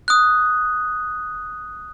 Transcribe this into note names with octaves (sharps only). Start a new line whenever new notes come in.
D#6 F#6